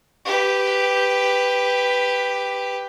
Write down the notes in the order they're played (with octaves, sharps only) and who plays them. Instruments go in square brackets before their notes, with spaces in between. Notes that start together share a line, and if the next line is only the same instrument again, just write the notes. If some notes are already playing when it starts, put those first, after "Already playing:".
[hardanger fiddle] G4 B4